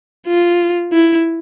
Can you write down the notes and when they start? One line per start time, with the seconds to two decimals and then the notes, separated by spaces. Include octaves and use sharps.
0.27 F4
0.93 E4